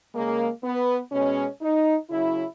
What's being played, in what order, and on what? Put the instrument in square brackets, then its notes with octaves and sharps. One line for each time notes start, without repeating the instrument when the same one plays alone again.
[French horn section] C#3 G#3 A#3
B3
B2 G#3 C#4
D#4
C#3 F#3 E4